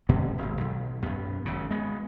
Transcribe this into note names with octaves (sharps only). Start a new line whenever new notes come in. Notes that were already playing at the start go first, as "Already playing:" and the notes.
B2 D3 B3 C#4
D#1 G#1
B1
F#2 B3
G#1 C#3
G#3 B3